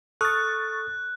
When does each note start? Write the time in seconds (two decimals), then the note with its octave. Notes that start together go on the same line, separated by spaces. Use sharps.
0.21 A4 C#6 D#6 F6 F#6 A6